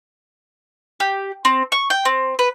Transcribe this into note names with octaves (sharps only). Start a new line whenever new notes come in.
G4
C4
C#6
G5
C4
B4